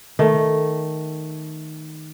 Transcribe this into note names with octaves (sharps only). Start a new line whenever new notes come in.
D#3 A3